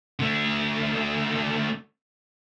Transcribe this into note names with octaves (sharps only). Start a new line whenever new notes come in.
D3 A3